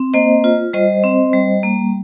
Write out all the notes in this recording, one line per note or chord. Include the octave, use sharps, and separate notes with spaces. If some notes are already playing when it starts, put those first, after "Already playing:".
Already playing: C4
A#3 C5 D#5
F4
G3 C5 D#5
C4
G3
A#3